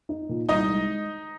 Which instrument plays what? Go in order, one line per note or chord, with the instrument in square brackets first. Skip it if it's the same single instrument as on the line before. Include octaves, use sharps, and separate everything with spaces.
[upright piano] D#4
A#2
[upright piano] C2 [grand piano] D#4 D#5
[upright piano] G#3